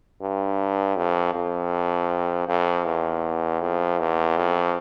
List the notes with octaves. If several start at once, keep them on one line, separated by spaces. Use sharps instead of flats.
G2
F2
F2
F2
E2
F2
E2
F2